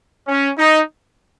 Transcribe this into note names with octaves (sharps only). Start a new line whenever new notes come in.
C#4
D#4